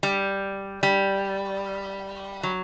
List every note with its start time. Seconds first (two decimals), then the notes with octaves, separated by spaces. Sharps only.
0.03 G3
0.83 G3
2.43 F#3